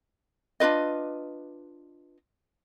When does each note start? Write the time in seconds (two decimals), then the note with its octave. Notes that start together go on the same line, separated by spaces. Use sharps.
0.60 D4 F4 B4 D#5